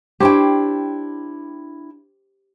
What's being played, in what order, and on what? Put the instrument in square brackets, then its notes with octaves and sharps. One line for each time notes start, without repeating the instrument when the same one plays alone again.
[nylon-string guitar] D4 E4 G5 [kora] G4 C5 C#5